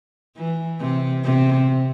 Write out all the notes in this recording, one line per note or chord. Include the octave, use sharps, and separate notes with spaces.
E3
C3
C3